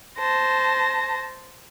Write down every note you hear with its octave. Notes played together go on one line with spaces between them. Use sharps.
C5 A5 A#6